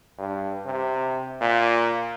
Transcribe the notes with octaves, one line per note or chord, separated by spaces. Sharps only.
G2
C3
A#2